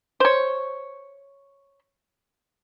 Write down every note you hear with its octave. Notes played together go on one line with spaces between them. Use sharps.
C5 C#5